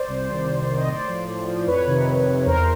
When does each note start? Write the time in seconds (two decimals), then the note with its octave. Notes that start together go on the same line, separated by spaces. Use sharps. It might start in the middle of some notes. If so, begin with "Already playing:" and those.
Already playing: C5 D5
0.08 C2
0.29 C3 D#3
0.48 C2
0.69 C3 D#3
0.77 D#5
0.88 A2 C5 D5
1.08 F3
1.27 A2
1.48 F3
1.67 F2 B4 C#5
1.87 C3 D#3
2.07 F2
2.27 C3 D#3
2.46 E2 A#4 C5